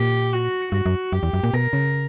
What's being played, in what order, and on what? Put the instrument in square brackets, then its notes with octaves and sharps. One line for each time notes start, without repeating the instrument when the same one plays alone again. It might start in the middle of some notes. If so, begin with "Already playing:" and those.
Already playing: [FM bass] A#2 [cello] G4
[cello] F#4
[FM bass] G2 [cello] F#4
[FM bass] F#2
[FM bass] F#2 [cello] G4
[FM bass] E2
F#2
A#2
[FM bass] B2 [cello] A#4
[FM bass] C#3